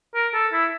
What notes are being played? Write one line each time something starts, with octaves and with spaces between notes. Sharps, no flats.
A#4
A4
E4